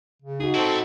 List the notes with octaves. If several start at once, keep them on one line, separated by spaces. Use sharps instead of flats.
C#3
D#4 F#4 G#4
A3 C4 E4 A4